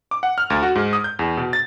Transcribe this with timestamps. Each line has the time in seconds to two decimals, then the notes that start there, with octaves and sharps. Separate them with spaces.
0.11 D6
0.23 F#5
0.38 F6
0.50 D2
0.63 F#4
0.75 G#2
0.93 D#6
1.04 G6
1.19 E2
1.37 B2
1.53 A6